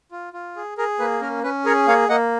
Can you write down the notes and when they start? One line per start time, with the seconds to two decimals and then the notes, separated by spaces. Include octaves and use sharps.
0.12 F4
0.33 F4
0.56 G#4
0.78 G#4 A#4
0.99 A#3 B4
1.21 C#4 A#4
1.43 C#4 B4
1.65 G#4 A#4 C#5
1.88 A#3 C#5 F5
2.09 A#3 D#5 F#5